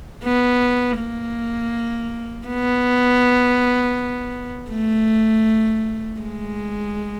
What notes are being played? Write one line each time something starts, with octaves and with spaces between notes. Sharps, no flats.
B3
A#3
B3
A3
G#3